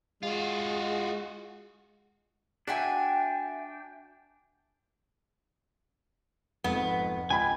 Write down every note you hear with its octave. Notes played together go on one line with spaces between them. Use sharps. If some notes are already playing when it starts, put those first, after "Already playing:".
G#3 F4 F#4
D4 F#4 E5 G5 G#5
F1 F2 G#2 B3
C#2 G5 G#5 B5